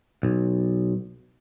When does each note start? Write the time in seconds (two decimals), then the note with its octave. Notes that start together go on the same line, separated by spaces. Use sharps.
0.23 B1